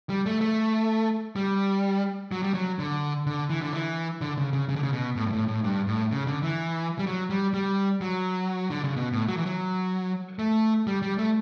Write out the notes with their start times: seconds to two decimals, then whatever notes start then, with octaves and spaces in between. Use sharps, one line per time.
0.09 G3
0.26 A3
0.41 A3
1.36 G3
2.32 F#3
2.43 G3
2.54 F#3
2.79 D3
3.26 D3
3.50 E3
3.62 D3
3.73 E3
4.21 D3
4.37 C#3
4.53 C#3
4.69 C#3
4.76 D3
4.83 C#3
4.93 B2
5.16 A2
5.26 G2
5.33 A2
5.48 A2
5.64 G2
5.87 A2
6.11 C#3
6.27 D3
6.43 E3
6.99 G3
7.06 F#3
7.30 G3
7.54 G3
8.01 F#3
8.71 D3
8.84 C#3
8.96 B2
9.12 A2
9.28 F#3
9.37 E3
9.46 F#3
10.39 A3
10.87 G3
11.02 G3
11.18 A3